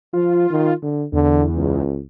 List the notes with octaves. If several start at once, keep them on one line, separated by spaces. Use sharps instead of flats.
F3 F4
D#3
D3
E2 D3
C#2